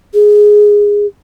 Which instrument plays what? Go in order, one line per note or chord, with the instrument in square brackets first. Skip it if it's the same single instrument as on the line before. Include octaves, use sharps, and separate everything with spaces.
[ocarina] G#4